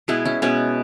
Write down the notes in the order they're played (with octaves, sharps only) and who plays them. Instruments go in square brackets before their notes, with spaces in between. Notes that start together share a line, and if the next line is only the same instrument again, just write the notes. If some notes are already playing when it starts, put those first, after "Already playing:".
[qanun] B2 G#3 B3 E4 G#4
C#4 E4
B2 G#3 B3 C#4